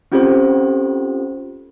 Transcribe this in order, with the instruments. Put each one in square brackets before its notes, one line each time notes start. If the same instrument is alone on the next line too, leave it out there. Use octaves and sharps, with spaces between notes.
[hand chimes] C4 C#4 F4 G4 A4 C5